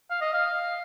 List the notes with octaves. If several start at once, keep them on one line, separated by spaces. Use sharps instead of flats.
F5
D#5
F5